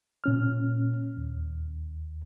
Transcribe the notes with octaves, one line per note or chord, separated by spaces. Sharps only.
A#2 C#4 F6
D#2